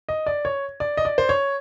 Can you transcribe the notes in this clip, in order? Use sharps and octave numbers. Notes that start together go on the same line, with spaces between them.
D#5
D5
C#5
D5
D#5
D5
C5
C#5